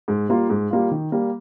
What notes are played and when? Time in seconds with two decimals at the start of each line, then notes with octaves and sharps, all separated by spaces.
0.08 G#2
0.29 G3 A#3 F4
0.49 G#2
0.71 G3 A#3 F4
0.91 D#3
1.12 G3 A#3